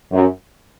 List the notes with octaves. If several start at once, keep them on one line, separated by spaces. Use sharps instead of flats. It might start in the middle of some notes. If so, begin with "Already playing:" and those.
F#2